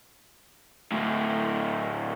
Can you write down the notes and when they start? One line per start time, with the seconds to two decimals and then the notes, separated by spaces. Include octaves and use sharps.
0.92 D2 A2